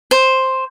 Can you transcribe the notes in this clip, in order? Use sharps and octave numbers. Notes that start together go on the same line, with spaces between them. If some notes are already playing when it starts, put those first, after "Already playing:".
C5